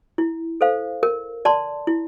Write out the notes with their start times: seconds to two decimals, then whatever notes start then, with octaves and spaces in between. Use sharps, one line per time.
0.18 E4
0.61 A4 C5 F5
1.03 A#4
1.45 D5 A5 C6
1.87 E4